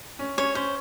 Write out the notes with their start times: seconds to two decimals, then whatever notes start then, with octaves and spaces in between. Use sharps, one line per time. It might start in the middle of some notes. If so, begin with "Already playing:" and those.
0.19 C#4
0.38 C#4 C#5
0.55 C#4 C5